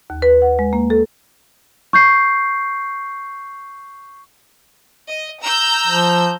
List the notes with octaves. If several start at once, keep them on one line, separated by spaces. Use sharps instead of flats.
D#2
B4
F#5
G#3
A#3
A4
C#6 G6 C7
D#5
A#5 E6 G6
F3